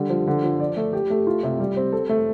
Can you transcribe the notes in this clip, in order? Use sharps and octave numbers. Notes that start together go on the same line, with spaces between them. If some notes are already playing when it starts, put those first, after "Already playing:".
Already playing: D3 G3
F3
D3
F3
D5
A3
G4
A3
F4
C3
G3
C4
A4
A3